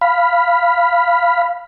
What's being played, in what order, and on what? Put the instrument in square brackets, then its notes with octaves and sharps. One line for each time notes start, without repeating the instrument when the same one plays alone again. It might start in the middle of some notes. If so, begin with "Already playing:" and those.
[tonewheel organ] F5 B5